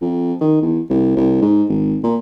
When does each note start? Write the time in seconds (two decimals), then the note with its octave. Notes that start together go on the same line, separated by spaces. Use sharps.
0.02 F2
0.41 D#3
0.62 E2
0.90 C2
1.17 C2
1.42 G#2
1.69 G#1
2.04 A#2